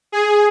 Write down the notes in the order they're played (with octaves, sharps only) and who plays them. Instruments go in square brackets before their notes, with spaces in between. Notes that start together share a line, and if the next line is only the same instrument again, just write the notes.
[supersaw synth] G#4